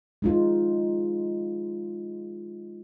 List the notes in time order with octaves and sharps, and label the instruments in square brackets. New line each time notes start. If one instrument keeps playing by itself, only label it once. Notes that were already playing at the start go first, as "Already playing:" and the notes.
[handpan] G#3 D#4 F4